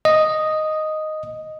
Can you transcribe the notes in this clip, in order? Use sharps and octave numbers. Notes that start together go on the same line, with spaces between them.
D#5